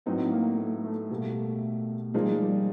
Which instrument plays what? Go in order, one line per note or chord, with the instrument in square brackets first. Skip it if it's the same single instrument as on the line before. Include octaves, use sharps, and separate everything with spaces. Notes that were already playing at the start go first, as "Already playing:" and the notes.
[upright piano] A2 F#3 B3 D#4 [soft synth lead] C4
[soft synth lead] A#3
A3
A3
[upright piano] B2 G3 A#3
[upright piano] A#2 F3 A#3 D#4 G#4 [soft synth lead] G#3
[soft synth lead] G3
G#3
G3